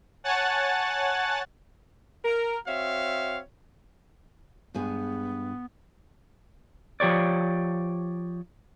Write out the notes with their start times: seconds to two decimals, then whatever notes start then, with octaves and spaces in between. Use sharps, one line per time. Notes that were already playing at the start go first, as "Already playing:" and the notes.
0.24 C#5 F#5 G#5 A5 F#6 A6
2.25 A#4
2.67 C4 F#4 C#5 E5 F5
4.74 G2 G#3 B3 G#4
7.00 F3 G4 C#5 D5